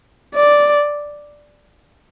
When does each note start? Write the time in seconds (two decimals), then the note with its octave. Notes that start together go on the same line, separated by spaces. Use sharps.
0.35 D5